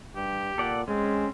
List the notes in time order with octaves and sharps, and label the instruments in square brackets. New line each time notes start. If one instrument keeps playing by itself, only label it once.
[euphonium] G2 [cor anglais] G4
[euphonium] A#2 [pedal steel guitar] A4 D5 F#5
[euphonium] G#3 [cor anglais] C4 [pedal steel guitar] C#4